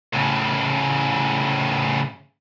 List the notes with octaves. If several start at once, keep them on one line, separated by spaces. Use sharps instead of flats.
A2 C#3